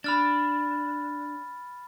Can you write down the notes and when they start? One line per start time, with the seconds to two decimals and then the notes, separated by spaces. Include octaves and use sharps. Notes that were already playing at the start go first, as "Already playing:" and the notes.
0.04 D4 B5 F6 A6